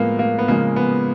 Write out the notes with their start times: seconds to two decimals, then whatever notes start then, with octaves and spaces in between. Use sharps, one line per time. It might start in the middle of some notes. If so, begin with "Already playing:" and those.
Already playing: A2 F3 G#3 A#3 B3
0.19 A#3
0.39 B3
0.48 C#3 F3 G#3 A#3
0.76 B3